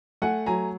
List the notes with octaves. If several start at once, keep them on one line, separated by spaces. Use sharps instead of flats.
A3 F#5 G#5
F#3 G#5 A#5